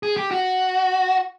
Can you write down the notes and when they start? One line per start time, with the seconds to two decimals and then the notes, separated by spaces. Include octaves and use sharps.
0.03 G#4
0.17 G4
0.31 F#4